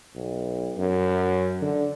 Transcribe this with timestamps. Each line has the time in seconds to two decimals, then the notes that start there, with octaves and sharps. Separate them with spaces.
0.15 B1
0.78 F#2
1.62 D3